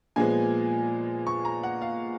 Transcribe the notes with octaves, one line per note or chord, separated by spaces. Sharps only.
A#2 F3 G#3 B3 G#5
C#6
A#5
F#5
F5